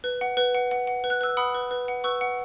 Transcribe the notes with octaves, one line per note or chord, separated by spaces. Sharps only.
B4
F#5
B4
F#5
F#5
F#5
B4
F#6
B4 E6
F#5 B5 D#6
B4
B4
F#5
B4 C#6 E6
F#5